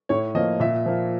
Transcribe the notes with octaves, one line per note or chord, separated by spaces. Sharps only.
A2 C#5
F3 A#3 D#5
A#2 E5
F3 A#3